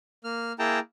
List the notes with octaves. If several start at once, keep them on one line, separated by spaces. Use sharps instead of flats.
A#3 F6
A#3 E4 G#4 G5 A5 A#5